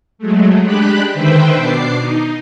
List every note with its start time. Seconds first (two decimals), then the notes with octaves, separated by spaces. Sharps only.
0.18 F#3 G#3 A3
0.63 G#3 D4 G4 B5 F#6
1.14 D3 D#3 B4 C5 E5 G5
1.54 B2 D4 D6 C7
1.97 D#4